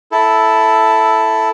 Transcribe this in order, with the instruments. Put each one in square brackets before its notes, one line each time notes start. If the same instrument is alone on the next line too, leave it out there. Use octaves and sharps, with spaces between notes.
[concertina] E4 A4